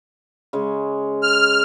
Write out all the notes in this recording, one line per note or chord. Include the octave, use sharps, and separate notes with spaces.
C#3 G#3
F6